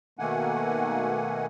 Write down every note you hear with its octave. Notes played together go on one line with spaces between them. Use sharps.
B2 D#3 A3 A#3 F#5 G#5